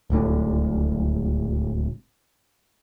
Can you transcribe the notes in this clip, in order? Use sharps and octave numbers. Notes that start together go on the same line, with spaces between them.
D1 C#2 A2 D3